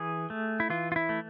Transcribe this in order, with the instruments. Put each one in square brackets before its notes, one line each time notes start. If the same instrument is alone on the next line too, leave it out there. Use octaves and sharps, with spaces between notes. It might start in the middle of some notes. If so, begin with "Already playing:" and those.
Already playing: [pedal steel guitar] E3 G#4
A3
E4
E3 F4
F4
E4
A3